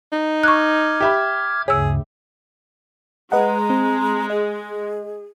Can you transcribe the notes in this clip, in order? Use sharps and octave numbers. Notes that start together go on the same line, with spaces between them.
D#4
C#6 D6 F6 F#6 G#6
G4 E5 B5
D2 G2 C#3 G#4 C#5 E6
G#3 B4 D#5 F#5 A#5
C4
G#4 D#5